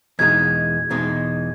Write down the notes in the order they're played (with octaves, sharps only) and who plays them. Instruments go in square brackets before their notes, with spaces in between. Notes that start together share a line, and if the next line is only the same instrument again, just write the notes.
[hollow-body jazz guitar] E2 B2 G#3 D#4 [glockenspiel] G#6
[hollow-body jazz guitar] E2 B2 G#3 D#4